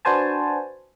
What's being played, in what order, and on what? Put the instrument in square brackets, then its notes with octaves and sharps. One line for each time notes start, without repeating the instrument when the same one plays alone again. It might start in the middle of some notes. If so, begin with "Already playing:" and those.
[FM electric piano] D4 F#4 B4 C5 G#5 A5